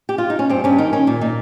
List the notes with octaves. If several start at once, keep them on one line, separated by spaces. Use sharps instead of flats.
G4
F4
D#4
C#4
G2 C4
G2 C#4
D#3 D#4
D#3 C#4
A#2
A#2 D#4